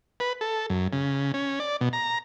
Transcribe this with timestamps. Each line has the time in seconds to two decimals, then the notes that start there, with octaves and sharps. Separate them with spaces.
0.20 B4
0.41 A4
0.70 F#2
0.93 C#3
1.34 C#4
1.60 D5
1.81 B2
1.93 A#5